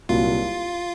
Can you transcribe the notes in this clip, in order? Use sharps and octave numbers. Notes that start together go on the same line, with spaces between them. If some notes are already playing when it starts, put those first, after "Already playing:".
C2 A#2 F#3 F4